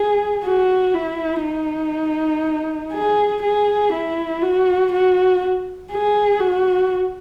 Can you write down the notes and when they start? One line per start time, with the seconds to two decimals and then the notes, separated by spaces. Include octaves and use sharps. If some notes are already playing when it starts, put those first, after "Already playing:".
Already playing: G#4
0.44 F#4
0.94 E4
1.44 D#4
2.93 G#4
3.42 G#4
3.93 E4
4.42 F#4
4.92 F#4
5.92 G#4
6.40 F#4